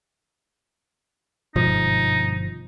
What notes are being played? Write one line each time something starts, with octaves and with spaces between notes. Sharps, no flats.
G1 G#2 B2 F3 D#4